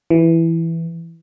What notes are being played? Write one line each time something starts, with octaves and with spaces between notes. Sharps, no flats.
E3